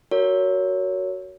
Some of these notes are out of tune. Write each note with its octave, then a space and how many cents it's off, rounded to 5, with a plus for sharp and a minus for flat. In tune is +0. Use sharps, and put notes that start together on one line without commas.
F#4 +10 A#4 -15 C#5 +15